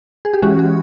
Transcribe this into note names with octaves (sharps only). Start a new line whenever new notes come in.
G#4
G4
E3 G#3 C#4 F#4
F#4